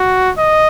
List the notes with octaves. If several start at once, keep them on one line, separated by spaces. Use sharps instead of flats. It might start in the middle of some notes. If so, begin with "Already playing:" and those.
Already playing: F#4
D#5